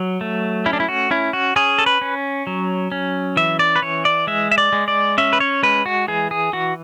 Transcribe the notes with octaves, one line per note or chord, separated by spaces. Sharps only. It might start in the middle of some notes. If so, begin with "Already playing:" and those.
Already playing: F#3
A3
C#4 E4
D4
E4
F#4
C#4 E4
F#4
C#4 G#4
A4
B4
C#4
F#3
C#4
E3 E5
D5
B4
E3 C#5
D5
G#3 E5
E5
D5
G#3
D5
C#4 E5
B4
C#5
G#3 B4
F#4
E3 G#4
G#4
E3 F#4